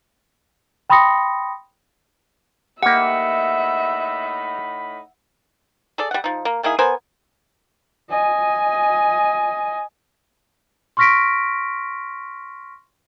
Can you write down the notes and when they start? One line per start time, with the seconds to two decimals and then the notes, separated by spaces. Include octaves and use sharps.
0.90 G5 B5 C6 D#6 A#6 C#7
2.83 A2 A#3 D#4 G4 E5 F#5 B5
5.98 G#4 A4 D5
6.11 G3 F#5
6.24 F3 D#4
6.45 A#3
6.63 D#3 A#3 E4 G#4
6.79 B3 A#4 C5 G#5
8.10 D#5 G#5
10.97 C6 C#6 F6 A#6 B6 D7